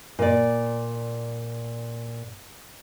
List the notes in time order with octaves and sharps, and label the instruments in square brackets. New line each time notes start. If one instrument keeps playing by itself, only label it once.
[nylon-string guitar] A#2 D5